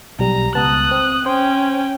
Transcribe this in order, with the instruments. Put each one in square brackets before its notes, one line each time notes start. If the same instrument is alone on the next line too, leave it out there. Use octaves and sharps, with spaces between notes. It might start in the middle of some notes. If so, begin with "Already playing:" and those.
[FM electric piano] B1 G3 [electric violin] A#5
[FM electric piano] C#2 B3 A5 [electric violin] D#6 F#6
[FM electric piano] C4
[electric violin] C#4 G5 [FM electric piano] C5